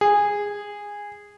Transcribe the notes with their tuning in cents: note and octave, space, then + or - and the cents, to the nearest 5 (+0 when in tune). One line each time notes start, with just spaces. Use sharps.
G#4 -15